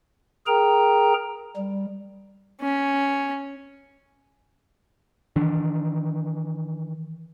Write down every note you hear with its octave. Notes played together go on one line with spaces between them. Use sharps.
G#4 A#4 G5 A#5
G3
C#4
D#3 E3 D4